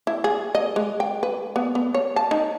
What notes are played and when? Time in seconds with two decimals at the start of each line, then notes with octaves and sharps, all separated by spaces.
0.07 E4
0.24 G#4
0.55 D#5
0.76 G#3
1.00 G5
1.23 B4
1.56 B3
1.75 B3
1.94 C#5
2.16 A5
2.31 D#4